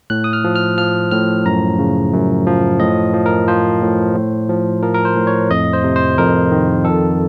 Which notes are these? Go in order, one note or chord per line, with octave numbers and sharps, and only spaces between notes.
A2 F#6
D#6
F6
F3
F6
F3 F6
A2 F6
F#2 A#5
C#3
F#2
F3
A2 D#5
F3
A#4
F3 C5
A2
A2
F3
F3 A#4
A#4
C5
A2
C#5
F2 D#5
C5
C3
C5
F2 A#4
D#3
F2 A4